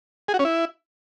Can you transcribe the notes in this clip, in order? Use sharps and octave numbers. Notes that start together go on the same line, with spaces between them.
G#4
F#4
C#4
E4